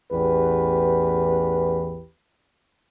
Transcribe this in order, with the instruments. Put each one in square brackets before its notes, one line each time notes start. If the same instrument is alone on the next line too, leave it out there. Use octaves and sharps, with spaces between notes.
[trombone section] A1 E2 G4 B4